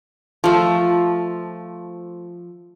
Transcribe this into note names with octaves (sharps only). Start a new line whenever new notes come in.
F3 A3